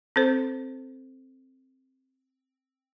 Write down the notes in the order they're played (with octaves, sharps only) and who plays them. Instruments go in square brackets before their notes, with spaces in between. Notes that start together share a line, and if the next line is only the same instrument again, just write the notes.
[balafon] C4 A4 C5